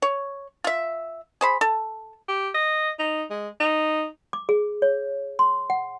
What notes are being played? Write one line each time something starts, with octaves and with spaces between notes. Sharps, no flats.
C#5
F4 E5
G#4 C5 B5
A4
G4
D#5
D#4
G#3
D#4
D6
G#4
C#5
C6
F#5